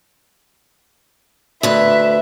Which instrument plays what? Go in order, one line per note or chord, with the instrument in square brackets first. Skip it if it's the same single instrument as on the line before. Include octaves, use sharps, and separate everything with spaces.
[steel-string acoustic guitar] D2 B4 [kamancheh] E5